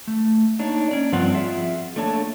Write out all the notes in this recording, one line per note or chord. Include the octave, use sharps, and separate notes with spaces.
A3
A#3 D4 D#4 C#5
C#4 D5
G2 F3 C4 F4 F#5
F4 G#4 E5
A3 A#3 D4 A4 C#5 A5